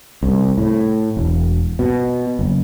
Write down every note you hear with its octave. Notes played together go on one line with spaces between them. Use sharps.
C2
A2
E1
B2
F#1